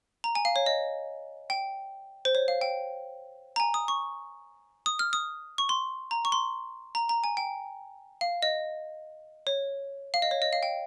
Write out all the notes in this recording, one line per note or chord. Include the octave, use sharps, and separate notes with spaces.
A#5
G#5
F5
C#5
D#5
G5
C5
C#5
F5
G5
A#5
G#5
D#6
C#6
D#6
F6
D#6
C#6
C6
A#5
C#6
C6
A#5
A#5
G#5
G5
F5
D#5
C#5
F5
D#5
C#5
D#5
F5
G5